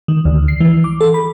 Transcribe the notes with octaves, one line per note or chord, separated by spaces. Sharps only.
D#3
D2
C7
E3
D6
A4
B5